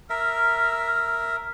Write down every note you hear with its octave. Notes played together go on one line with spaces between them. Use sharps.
A#4 E5 F6